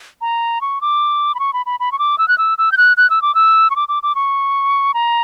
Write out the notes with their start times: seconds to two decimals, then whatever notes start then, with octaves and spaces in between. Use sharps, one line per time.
0.21 A#5
0.61 C#6
0.81 D6
1.35 B5
1.40 C#6
1.53 B5
1.66 B5
1.80 B5
1.92 C#6
1.99 D6
2.18 E6
2.28 F#6
2.38 E6
2.58 E6
2.72 G6
2.77 F#6
2.97 F#6
3.10 E6
3.22 D6
3.35 E6
3.70 C#6
3.76 D6
3.89 D6
4.03 D6
4.15 C#6
4.94 A#5